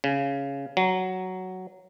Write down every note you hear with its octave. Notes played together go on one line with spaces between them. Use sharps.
C#3
F#3